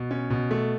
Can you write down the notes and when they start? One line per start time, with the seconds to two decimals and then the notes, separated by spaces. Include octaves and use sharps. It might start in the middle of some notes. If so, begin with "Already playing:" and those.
Already playing: B2
0.11 C#4
0.30 B2
0.51 A3